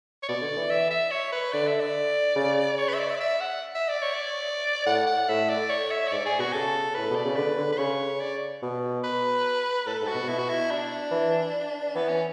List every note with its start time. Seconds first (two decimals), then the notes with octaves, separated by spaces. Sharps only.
0.23 C#5
0.29 B2 D5
0.41 D3
0.56 E3
0.70 E5
0.90 E5
1.11 C#5
1.32 B4
1.53 D3 D5
1.67 E5
1.80 D5
2.36 C#3
2.78 C#5
2.89 B4
2.94 E5
2.99 D5
3.09 E5
3.15 D5
3.20 E5
3.41 F#5
3.75 E5
3.89 D5
4.02 C#5
4.14 D5
4.86 A2 F#5
5.07 F#5
5.29 A2 E5
5.49 D5
5.70 C#5
5.91 E5
6.07 C#5
6.12 G#2 D5
6.26 G#4
6.39 B2 F#4
6.53 C#3 A4
6.95 A2 B4
7.10 B2 D5
7.24 C#3
7.36 D3 B4
7.57 D3
7.72 B4
7.78 C#3 C#5
8.20 D5
8.62 B2
9.04 B4
9.86 A2 A4
10.01 G#2
10.08 F#4
10.15 B2
10.28 B2 E4
10.39 F#4
10.49 E4
10.71 D4
11.11 E3
11.95 E3 B3
12.09 C#4